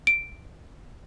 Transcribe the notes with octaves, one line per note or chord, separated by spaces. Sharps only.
D7